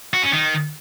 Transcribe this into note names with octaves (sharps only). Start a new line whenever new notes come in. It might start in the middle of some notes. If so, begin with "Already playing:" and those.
F#4
C#4
D#3